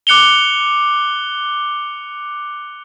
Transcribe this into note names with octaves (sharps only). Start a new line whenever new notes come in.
D6 F#6 C#7 F7 G7